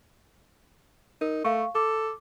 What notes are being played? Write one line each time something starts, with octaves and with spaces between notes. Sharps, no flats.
D#4 A#4
A3 F5 C#6
A4 D6